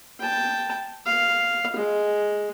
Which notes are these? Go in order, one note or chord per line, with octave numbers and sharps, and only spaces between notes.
G5 A5
F5
G#3